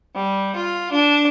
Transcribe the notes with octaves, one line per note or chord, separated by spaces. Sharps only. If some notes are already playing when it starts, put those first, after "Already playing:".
G3
F4
D4